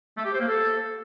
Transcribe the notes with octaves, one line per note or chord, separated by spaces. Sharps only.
A3
G4
C5
A#3
A4